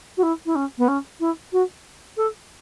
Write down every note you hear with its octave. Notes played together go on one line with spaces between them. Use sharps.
F#4
E4
E4
C#4
B3
C#4
E4
F#4
A4